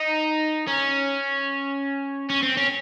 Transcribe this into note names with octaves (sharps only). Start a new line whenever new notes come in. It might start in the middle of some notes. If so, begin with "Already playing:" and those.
Already playing: D#4
C#4
C#4
C4
C#4